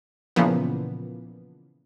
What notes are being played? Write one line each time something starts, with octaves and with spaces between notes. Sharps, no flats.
A#2 C#3 E3 F3 A#3 B3